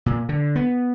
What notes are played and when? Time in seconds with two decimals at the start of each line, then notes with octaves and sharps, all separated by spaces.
0.06 A#2
0.29 D3
0.56 B3